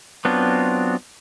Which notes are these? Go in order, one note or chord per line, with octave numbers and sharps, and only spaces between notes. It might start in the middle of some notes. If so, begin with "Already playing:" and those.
F#3 B3 C4 D4 F4